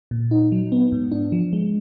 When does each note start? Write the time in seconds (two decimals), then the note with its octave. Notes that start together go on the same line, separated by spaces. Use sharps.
0.11 A#2
0.31 D#4
0.52 F#3
0.72 B3
0.92 G#2
1.12 D4
1.32 F3
1.53 G#3